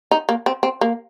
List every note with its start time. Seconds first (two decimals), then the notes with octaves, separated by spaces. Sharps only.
0.11 D#4
0.29 A#3
0.46 C4
0.63 C4
0.81 A#3